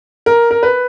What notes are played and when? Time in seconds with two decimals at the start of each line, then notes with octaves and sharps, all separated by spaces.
0.26 A#4
0.51 A#4
0.63 B4